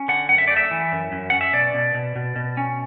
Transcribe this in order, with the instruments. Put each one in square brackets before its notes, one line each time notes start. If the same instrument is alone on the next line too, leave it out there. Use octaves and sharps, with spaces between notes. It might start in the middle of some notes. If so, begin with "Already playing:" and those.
Already playing: [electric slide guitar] C#4
D3 F#5
F#2 F#5
E5
A3 D5
E5
E3
F#2
F#2
C#4 F#5
E5
B2 D5
B2
B2
B2
B2
C#4